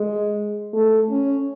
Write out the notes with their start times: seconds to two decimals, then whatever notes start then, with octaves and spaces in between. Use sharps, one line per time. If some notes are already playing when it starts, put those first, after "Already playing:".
Already playing: G#3
0.73 A3
1.10 C#4